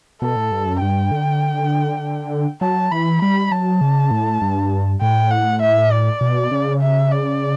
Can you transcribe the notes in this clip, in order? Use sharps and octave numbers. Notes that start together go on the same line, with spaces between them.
B2 A4
A2
G2
F#2
G2 G5
D3
F#3 A5
E3 B5
G3 B5
F#3 A5
C#3
A2
G2
A2 G5
F#5
E5
D5
B2
C#3
E5
D5